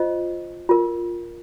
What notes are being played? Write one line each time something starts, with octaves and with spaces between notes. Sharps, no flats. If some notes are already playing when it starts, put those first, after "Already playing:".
Already playing: F4 C5 D#5
F4 A#4